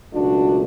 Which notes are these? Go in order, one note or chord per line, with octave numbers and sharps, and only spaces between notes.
C#2 B2 F#3 A3 D4 F#4